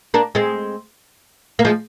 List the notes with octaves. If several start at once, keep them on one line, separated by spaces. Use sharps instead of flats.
A#3 D4
G#3 C4
A#3
F3 G#3